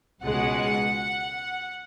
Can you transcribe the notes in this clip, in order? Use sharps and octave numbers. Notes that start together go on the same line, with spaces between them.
C#2 B2 G#3 F#5